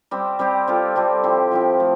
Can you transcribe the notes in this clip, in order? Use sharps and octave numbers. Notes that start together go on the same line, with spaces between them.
G3 C4 G4
G3 C4 G4
G3 C4 F4 A4
G3 C4 F4 A4
F3 C4 E4 G4
F3 C4 E4 G4
F3 A3